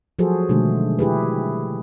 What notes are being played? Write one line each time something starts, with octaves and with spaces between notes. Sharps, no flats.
F3 F#3 F#4 G#4 A4 C5
B2 D3 D#3 G#3 A3
E4 G4 G#4 B4